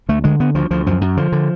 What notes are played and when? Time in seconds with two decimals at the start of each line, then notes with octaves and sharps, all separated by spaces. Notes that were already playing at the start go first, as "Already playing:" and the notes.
0.09 D2 A3
0.24 D3 G#3
0.40 D3 B3
0.55 D2 F3
0.71 D2 F3
0.86 F#2 F3
1.01 F#2
1.17 D3 F3
1.32 D3